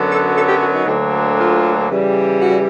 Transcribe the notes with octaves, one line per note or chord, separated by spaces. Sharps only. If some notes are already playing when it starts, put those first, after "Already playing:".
Already playing: F#2 D3 F#3 B3
A4
A4
G4
F#4
D#4
D2 D3 F#3 A#3
F4
C#3 E3 G3
F#4